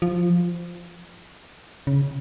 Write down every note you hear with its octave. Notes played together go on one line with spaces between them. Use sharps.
F3
C#3